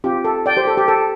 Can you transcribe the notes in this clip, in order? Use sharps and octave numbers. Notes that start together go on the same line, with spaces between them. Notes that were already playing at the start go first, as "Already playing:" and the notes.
C4 F4 G4
A4
D5 G5
G4 C5
A4
G4
A4